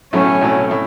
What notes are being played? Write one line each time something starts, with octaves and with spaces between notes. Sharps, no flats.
B1 A2 F#3 A3 C#4
B1 A2 F#3 A3
A2